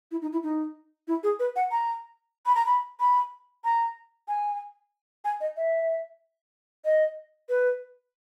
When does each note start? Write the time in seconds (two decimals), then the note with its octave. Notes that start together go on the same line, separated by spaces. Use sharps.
0.11 E4
0.22 D#4
0.33 E4
0.43 D#4
1.08 E4
1.23 G#4
1.39 B4
1.56 F#5
1.71 A#5
2.46 B5
2.55 A#5
2.66 B5
3.00 B5
3.64 A#5
4.28 G#5
5.25 G#5
5.41 D#5
5.57 E5
6.85 D#5
7.49 B4